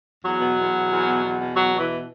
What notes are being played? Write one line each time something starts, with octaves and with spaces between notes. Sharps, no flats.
E2 F#3
B2
E2
B2
E2
B2
E2
B2
E2 F#3
B2
E3